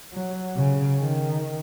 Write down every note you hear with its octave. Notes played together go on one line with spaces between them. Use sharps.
F#3
C#3
D#3